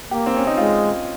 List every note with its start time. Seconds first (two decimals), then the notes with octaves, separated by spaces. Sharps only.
0.11 A#3 G4
0.26 C4
0.37 C#4
0.47 D#4
0.57 G#3 F4